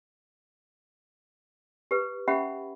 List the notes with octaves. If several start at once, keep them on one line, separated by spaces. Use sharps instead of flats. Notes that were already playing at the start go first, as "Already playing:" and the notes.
G4 B4
C#4 G4 E5 F#5 B5